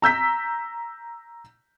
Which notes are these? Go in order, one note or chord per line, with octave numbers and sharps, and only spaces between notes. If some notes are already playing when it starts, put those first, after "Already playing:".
A#5 E6 G6 B6